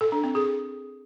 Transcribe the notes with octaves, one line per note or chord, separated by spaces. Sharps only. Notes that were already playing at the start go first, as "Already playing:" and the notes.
A4
D4
C4
G#4